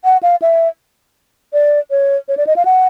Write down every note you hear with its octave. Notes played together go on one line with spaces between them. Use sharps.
F#5
F5
E5
D5
C#5
C#5
D5
D#5
F5
F#5